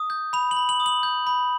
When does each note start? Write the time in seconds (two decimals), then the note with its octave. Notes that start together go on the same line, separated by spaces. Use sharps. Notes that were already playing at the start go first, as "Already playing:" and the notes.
Already playing: D#6
0.10 G6
0.33 B5 F7
0.51 F#7
0.56 B5
0.69 F#7
0.80 D#6
0.86 F#7
1.03 G6
1.27 B5